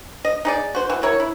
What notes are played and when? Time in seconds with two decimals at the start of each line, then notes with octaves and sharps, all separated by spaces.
0.25 D#5
0.45 D#4 G#4 D5
0.75 F#4 C5
0.90 E3 F#4
1.03 E4 A#4 C#5
1.20 E4